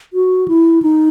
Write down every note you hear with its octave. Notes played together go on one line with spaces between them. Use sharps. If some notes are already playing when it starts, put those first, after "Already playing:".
F#4
E4
D#4